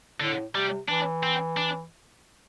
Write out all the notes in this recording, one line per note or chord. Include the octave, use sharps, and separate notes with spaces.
A2 D3
C3 G3
E3 D4
C4
D4